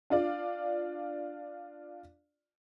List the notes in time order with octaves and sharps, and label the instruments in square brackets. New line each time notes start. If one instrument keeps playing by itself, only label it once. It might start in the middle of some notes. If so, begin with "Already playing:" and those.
[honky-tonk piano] D4 F4 D5